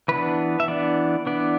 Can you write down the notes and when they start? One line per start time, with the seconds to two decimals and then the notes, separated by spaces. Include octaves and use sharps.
0.08 E3 B3 D4 B4
0.60 E5
0.68 E3 B3 D4 D5
1.27 E3 B3 D4 D5